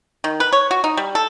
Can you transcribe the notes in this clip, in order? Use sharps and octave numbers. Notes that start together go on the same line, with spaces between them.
D#3
B4
C#5
F#4
D#4
G3
A4